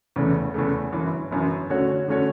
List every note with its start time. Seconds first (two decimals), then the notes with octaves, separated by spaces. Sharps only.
0.16 E2 C#3 E3 A3
0.54 E2 C#3 E3 A3
0.93 G1 F#2 E3
1.31 G1 F#2 E3
1.70 D3 A3 C#4 F#4 C#5
2.08 D3 A3 C#4 F#4 C#5